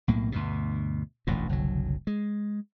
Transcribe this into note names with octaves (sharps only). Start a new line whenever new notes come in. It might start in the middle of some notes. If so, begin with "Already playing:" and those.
B1 A2 A#3
D2 G2 B2
E1 A1 D2 A#2
F#1 C2 D3 F#3
G#3